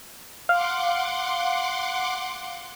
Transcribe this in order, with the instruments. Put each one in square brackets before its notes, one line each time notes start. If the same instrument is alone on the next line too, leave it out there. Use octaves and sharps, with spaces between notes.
[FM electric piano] F5 [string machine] F#5 C6 D6